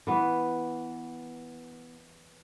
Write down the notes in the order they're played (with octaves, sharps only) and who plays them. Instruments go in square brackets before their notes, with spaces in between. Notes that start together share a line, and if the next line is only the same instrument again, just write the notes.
[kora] E3 B3